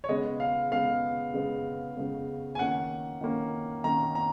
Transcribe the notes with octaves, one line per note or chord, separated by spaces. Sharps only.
C#5
C#3 G#3 B3 D#5
F5
C#3 G#3 B3 F5
C#3 G#3 B3
C#3 G#3 B3
G#5
D#3 A#3 C#4 F#5
D#3 A#3 C#4
D#3 A#3 C#4 A#5
A#5